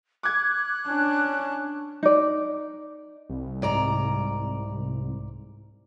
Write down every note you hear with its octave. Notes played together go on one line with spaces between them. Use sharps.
D6 F#6 G#6
C#4 D4
D#4 D5
C2
G#2 D5 A#5